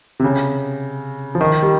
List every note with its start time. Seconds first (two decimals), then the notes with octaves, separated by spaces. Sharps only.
0.20 C3
0.24 C#3
1.35 F3
1.41 D#3
1.63 G3